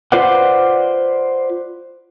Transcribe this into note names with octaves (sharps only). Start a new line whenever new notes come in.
F4 B4 C5 D5 F#5